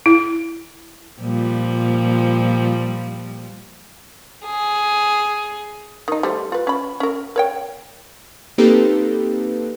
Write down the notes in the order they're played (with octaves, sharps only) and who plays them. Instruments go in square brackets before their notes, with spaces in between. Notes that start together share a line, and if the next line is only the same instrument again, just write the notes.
[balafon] E4
[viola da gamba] A#2 F3 G3
[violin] G#4
[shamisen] D#3 D#4
G3 A3 C5
F4 B4
C#4 B5
C#4 A#4
A#4 C#5 G5
[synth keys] A#3 C4 D#4 G4 A4 B4